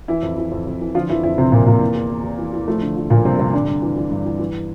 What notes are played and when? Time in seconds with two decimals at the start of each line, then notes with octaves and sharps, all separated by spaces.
0.08 E3 E4
0.23 F2
0.38 E3
0.51 F2
0.67 F2
0.81 E3
0.95 D3 F3 F4
1.09 F2 E3 E4
1.23 F2 E3 E4
1.38 C3 F3 C4
1.52 F2 A#2 A#3
1.66 A#2 F3 A#3
1.81 E3
1.95 E2
2.10 E2
2.24 E2
2.38 E3
2.53 E3
2.68 F3 A3
2.82 D3
2.96 F3
3.10 A#2 F3 A#3
3.25 G2 C3 C4
3.39 G2 C3 C4
3.54 G2 D3 D4
3.68 G2
3.82 E3
3.96 E3
4.10 G2
4.26 E3
4.39 E3